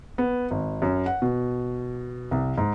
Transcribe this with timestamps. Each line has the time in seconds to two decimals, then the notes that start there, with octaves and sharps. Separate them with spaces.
0.18 B3
0.51 G#1
0.82 F#2
1.06 F#5
1.22 B2
2.31 C2
2.58 G#2